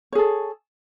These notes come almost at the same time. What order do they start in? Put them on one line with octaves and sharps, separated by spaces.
C#5 G#4 A4